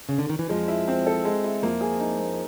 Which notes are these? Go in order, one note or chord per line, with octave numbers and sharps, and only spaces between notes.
C#3
D3
D#3
E3
F2 F3 G#3
E4
C4
A4
G#3
E4
F2 F3 A#3
G#4
D#4
A#3